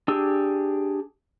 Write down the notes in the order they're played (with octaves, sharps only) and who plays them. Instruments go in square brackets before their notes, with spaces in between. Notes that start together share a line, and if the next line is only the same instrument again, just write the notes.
[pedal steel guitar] D4 G4 G#4 E6